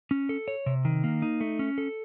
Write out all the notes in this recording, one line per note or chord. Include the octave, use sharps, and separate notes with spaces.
C#4
A4
C#5
C3
D#3
A#3
D#4
A3
C#4
A4